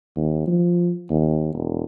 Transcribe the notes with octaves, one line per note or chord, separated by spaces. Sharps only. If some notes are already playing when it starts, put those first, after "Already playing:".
D#2
F3
D#2
E1